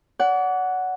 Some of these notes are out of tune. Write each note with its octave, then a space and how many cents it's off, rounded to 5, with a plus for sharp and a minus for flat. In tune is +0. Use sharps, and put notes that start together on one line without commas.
D5 -45 F#5 +0